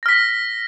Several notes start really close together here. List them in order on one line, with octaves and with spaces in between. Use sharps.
A#6 F6 B6